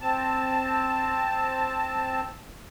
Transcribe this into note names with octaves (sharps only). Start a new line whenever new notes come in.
C4 A5